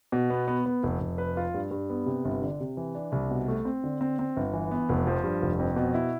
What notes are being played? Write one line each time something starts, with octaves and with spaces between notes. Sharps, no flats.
B2
B3
B3
B3
F1
F1
B4
F4
G2
G2
B3
C3
G1
D3
C3
E3
D4
C2
B2
A3
C4
D3
C4
C4
G1
E3
B3
F1
F3
G2
F1
F2
B2
E4